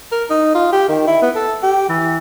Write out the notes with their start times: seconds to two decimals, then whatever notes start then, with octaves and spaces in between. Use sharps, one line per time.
0.12 A#4
0.30 D#4
0.55 F4
0.72 G4
0.89 D#3
1.07 E4
1.22 B3
1.35 A4
1.63 G4
1.89 E3